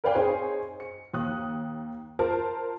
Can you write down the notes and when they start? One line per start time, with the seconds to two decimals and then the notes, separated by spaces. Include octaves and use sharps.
0.04 A#4 B4 D5 F5 G5 G#5
0.15 C4 D#4 G#4 C5 C#5 G#5
0.80 C#7
1.14 D#2 D#6 F#6
2.19 F4 A#4 C5 A5